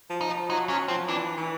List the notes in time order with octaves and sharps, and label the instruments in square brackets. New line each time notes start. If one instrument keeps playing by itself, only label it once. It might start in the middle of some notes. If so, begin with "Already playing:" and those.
[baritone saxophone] F3
[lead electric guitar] D#4
[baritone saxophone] F3
[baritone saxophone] F#3 [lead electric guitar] D#4
[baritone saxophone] F#3 [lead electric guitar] C#4
[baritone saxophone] F3 [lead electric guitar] C4
[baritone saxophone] E3 [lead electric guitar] D4
[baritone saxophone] E3